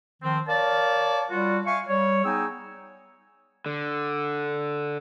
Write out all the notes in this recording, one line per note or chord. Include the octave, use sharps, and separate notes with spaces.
D#3 F3 C4
A#4 C#5 D5 F5 A5
G3 F4 F#4
E5 F5 G#5 C#6
G3 C#5
B3 D#4 G#4 G5 G#5 E6
D3